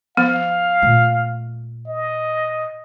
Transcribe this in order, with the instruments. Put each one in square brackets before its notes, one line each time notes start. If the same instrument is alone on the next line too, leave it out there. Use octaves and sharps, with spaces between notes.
[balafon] F3 B3 [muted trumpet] F5
[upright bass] A#2 A3
[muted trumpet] D#5